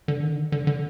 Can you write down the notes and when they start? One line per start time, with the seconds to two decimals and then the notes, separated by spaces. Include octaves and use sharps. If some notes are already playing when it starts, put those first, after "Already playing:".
0.08 D3
0.23 D#3
0.33 D3
0.52 D3
0.67 D3